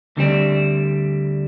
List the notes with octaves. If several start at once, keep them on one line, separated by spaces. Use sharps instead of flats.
D2 D3 G3 C4